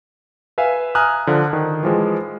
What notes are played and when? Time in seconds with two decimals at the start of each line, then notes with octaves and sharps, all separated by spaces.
0.58 B4 E5 F5 G#5
0.95 G#5 A#5 D#6 F6 F#6
1.27 D3 F3
1.53 D#3
1.83 E3 F3 G#3